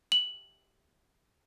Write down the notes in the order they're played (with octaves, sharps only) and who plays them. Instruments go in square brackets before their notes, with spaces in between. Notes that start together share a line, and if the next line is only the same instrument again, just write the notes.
[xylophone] F#7